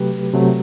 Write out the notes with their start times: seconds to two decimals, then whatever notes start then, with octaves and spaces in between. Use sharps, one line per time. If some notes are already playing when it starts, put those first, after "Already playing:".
Already playing: C3 F#3 A3 G4 B4
0.34 C3 F#3 A3